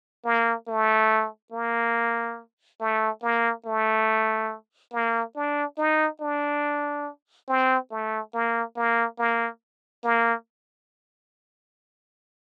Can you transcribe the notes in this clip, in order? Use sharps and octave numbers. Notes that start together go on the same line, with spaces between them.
A#3
A3
A#3
A3
A#3
A3
A#3
D4
D#4
D4
C4
A3
A#3
A#3
A#3
A#3